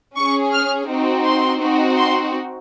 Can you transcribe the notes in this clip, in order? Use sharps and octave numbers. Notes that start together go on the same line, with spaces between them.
C#4 G#4 C#6
F6
C4 D#4 F#4
C6
C4 D#4 F#4
C6